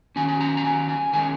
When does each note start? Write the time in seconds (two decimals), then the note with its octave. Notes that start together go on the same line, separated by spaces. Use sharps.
0.16 D#3 F#3 C#4 G#5
0.29 G#5
0.41 A#5
0.57 A#5
0.65 G#5
0.89 G#5
1.13 D#3 G#3 C#4 G#5